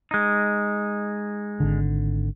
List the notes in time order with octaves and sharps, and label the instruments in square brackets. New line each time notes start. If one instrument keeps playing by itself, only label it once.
[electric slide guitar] G#3 D#4
[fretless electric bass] G#1 D3